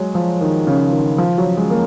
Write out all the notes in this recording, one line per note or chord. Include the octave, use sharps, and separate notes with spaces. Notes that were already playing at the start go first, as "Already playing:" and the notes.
Already playing: F#3 G#3
F3
D#3
C#3
D#3
F3
F#3
G#3
A#3